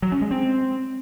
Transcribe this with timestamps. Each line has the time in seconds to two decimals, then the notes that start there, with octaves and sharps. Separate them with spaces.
0.02 F#3
0.12 C#4
0.22 G#3
0.31 C4